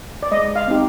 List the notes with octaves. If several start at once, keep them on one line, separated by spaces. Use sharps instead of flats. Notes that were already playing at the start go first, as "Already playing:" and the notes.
D5
G#3 D#5
F5
C4 D#4 G4